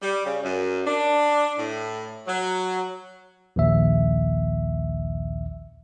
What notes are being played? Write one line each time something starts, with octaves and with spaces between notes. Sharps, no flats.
G3
C#3
F#2
D4
A2
F#3
A#1 D#2 E5